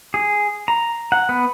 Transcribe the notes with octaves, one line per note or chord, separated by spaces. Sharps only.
G#4
A#5
F#5
B3